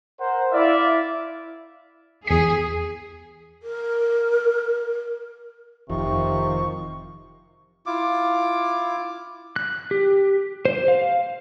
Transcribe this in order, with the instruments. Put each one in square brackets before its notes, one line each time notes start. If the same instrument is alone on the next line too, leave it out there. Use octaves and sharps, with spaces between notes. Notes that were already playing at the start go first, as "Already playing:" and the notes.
[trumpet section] A#4 C5 F#5
[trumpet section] E4 [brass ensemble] D5 E5 F5
[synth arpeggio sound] E2 B6 [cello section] G#4
[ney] A#4
[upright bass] F1 A2 [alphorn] C3 [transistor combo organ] D#3 F3 [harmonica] C#6
[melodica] E4 F4 D6
[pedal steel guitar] F#6
G4
C5
F5